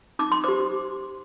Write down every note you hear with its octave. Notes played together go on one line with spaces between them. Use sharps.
D#4 D6
C6
G4 C5 D6